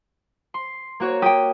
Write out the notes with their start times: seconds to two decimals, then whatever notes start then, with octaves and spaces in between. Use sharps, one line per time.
0.54 C6
1.00 A#3 F#4 C#5
1.22 G4 G5 D#6